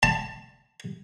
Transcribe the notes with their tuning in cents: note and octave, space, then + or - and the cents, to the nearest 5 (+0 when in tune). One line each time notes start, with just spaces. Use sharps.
A5 +15